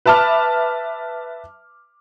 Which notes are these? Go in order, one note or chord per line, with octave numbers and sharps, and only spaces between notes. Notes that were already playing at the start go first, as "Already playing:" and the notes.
B4 E5 A5 D6 F6